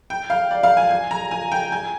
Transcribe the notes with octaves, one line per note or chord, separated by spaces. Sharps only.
G5
F5
D5
F5
G#5
G#5
A#5
G#5
G5
G#5